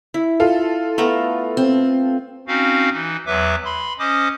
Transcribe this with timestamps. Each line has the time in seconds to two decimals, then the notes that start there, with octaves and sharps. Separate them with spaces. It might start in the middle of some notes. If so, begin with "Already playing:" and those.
0.14 E4
0.40 F4 A4
0.98 A3 B3 A#4
1.57 C4
2.48 C4 C#4 D#4 F#4 F5
2.92 E3 D#4
3.26 E2 F#3 B4 E5 D6
3.65 B5 C6
3.99 C#4 C5 D#5 D6 D#6